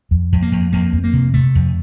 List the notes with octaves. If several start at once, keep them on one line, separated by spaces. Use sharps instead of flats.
F2
F2
A#3
F2
F2 A#3
F2
A#3
C3
C3 A3
F2